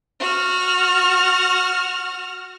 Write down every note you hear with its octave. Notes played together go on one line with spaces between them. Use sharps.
F#4 F6